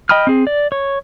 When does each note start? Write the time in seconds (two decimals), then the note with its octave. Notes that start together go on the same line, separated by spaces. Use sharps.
0.09 D#5 G5 B5 D#6 F6
0.27 C4 G#4
0.47 D5
0.72 C#5